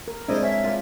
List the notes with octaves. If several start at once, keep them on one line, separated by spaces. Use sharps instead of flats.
A#4
G#3 C4 D4 E4 C5 D5 D#5
C#4 E5
A#3 F4